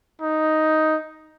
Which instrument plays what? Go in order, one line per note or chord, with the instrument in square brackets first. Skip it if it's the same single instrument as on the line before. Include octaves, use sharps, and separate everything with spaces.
[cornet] D#4